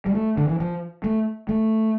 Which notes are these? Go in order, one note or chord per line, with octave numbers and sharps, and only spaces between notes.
G3
A3
D3
E3
F3
A3
A3